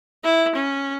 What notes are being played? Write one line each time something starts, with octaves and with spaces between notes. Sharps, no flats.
E4
C#4